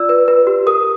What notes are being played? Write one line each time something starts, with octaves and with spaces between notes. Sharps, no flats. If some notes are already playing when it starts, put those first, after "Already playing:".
Already playing: F4 D5 E6
B4
B4
G4
A#4 D#6